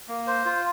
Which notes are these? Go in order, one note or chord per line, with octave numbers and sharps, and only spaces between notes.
A#3
C5
F4